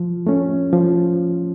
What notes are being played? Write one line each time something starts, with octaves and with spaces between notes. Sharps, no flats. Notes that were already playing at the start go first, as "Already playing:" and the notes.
Already playing: F3
A3 C#4
F3